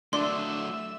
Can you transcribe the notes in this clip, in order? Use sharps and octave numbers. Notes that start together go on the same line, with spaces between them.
F#3 A3 D4 E5 C6 E6